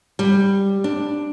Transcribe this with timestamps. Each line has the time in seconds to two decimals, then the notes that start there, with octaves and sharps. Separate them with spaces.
0.19 G3
0.84 D4